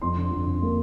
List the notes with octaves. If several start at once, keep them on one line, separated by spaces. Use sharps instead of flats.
F2 C6
D3
F2
D3
A#3